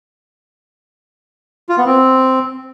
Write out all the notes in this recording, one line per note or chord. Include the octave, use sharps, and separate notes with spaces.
F4
B3
C4